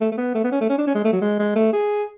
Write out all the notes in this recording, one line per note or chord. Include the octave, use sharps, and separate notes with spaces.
A3
A3
B3
A3
B3
C#4
A3
C#4
D4
C#4
G#3
A3
F#3
G#3
G#3
A3
G#4